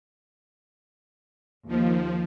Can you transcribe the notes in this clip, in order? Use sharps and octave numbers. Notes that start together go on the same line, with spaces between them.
D#2 F3